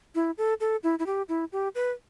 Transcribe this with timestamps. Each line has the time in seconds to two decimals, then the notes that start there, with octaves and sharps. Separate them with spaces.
0.15 E4
0.38 A4
0.60 A4
0.83 E4
0.99 E4
1.06 G4
1.29 E4
1.52 G4
1.75 B4